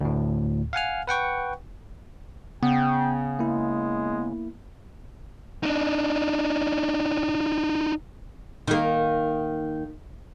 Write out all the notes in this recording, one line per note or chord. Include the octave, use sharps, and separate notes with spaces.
D2 A2
F5 F#5 G#5 F6
B4 F#5 G5 C#6
C#3 B3 G5
G#3 A#3 E4
D4 D#4
D#3 A#3